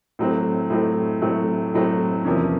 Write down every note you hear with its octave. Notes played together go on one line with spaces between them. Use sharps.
A2 F#3 A3 C4
A2 F#3 A3 C4
A2 F#3 A3 C4
A2 F#3 A3 C4
E2 C3 F3 A#3 C#4